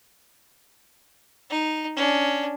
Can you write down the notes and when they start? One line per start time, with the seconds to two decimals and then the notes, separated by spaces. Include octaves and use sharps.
1.50 D#4
1.96 C#4 D4